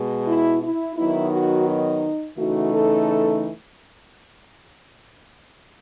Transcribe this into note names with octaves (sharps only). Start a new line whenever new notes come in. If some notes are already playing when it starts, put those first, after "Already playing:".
Already playing: B2 G#3
E4
E4
D#3 F#3 B3 D#4 E4
F#4
D#4
C#3 E3 A3 D#4 F#4
A4